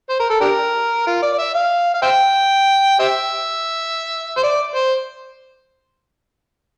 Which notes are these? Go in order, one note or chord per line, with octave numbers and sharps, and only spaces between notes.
C5
A#4
A4
D4 G4 A#4
F4
D5
D5
E5
F5
F5
C5 E5 G5
G4 C5 E5
C5
D5
C5